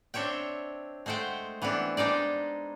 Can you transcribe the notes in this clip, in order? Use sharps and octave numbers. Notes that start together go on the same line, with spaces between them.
C4 D4 C#5 E5 G5
G#3 A3 C5 F#5 G5
E3 B3 C4 D4
G#3 D4 D#4 D5